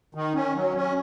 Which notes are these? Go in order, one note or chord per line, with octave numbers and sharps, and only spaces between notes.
D#3
C#4
F#3
C#4